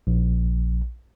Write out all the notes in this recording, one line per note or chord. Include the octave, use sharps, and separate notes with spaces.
A#1